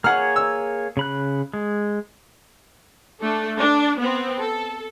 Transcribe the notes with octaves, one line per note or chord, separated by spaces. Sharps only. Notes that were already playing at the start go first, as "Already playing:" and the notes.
A#3 G#4 C#5 F#5 F6
E6
C#3 B5 F#6
G#3
A3 D4 A4
D4
B3 C4
A4